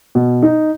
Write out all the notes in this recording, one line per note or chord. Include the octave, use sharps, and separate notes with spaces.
B2
D#4